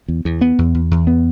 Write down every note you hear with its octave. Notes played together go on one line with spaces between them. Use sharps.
E2
E2
B3
E2
E2
E2
B3